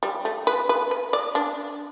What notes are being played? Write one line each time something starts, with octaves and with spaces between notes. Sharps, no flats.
G3
A3
B4
B4
B4
D5
D4